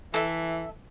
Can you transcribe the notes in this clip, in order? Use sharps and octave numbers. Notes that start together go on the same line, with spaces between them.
E3 A4 E5